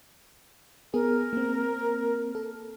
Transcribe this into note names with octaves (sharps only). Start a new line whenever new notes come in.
B3 G#4 A#4
A#3 C4
A4